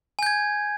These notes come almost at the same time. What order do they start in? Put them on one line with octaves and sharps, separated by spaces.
G#5 G6 G#6